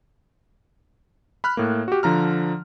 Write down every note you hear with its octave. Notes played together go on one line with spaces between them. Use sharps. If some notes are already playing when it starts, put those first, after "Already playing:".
B5 F6 F#6
A2 A#3
F#4 G4
D3 F3 A#5 F6